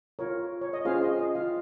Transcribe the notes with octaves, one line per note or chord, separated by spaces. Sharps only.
F4 A#4 C#5
C#5
D#5
C#4 F4 G#4 C5 F5
D#5
D#5
F4 F5